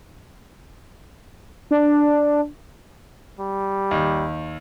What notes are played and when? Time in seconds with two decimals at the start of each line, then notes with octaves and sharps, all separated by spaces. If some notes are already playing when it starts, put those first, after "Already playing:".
1.71 D4
3.39 G3
3.91 D#2